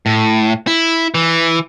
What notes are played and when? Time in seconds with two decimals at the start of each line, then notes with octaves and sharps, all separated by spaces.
0.06 A2
0.67 E4
1.15 E3